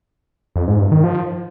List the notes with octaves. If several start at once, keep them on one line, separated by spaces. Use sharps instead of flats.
F2
G#2
G2
D#3
F3